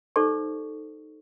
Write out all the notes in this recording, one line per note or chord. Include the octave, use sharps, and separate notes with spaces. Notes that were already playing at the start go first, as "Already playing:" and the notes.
D#4 G4 A4 C5 D5 C#6